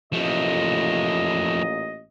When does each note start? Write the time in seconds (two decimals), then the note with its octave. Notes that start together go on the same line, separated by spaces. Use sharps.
0.13 A1 A#2 F3 A3 D#5